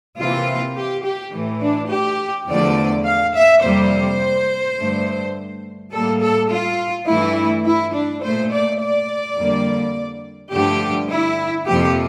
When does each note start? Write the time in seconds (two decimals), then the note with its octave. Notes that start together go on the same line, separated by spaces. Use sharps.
0.18 C3 E3 A#3 F4
0.76 G4
1.04 G4
1.33 A2 E3 A3
1.62 D4
1.91 G4
2.48 E2 D3 F3 A3 D5
3.05 F5
3.34 E5
3.63 F2 C3 G3 A#3 C5
4.79 G2 D3 A3
5.92 A2 G3 A#3 A4
6.22 A4
6.51 F4
7.07 G2 E3 A3 E4
7.65 E4
7.94 D4
8.22 A#2 A3 C5
8.51 D5
8.80 D5
9.37 F2 D3 G3 A#3
10.52 G2 D3 F3 A3 G4
11.09 E4
11.67 F2 C3 F3 A#3 G4